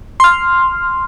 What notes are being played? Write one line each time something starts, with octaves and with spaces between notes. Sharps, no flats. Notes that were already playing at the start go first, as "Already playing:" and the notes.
C6 F6